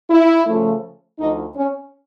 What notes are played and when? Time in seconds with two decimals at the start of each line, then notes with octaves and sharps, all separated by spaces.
0.10 E4
0.47 C#3 F3 A3
1.19 D2 D3 F3 D#4
1.56 C#4